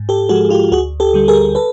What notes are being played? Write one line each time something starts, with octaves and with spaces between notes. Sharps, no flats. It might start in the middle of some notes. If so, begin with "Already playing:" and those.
Already playing: G#2
G4 A4
F3 G#3 F#4 G#4
F4 G4
D2 F#4 G#4
G4 A4
D3 G3
G#4 A#4
A4 B4